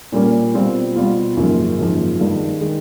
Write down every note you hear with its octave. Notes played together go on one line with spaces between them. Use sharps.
A#2 G3 A#3 C#4
B2 G3 C4 F4
B2 G3 C4 F4
G#1 F#2 C#3 F3 A#3
G#1 F#2 C#3 F3 A#3
G2 D#3 G#3
D#3 G#3